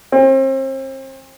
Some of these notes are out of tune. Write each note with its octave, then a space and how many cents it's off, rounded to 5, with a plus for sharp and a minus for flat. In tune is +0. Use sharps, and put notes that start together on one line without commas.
C4 +35